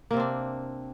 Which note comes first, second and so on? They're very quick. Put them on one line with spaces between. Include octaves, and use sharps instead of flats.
A#3 C3 C4 D4